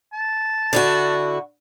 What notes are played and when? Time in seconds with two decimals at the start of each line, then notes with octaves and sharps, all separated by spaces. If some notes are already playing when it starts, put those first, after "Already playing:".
0.13 A5
0.73 D3 E4 F#4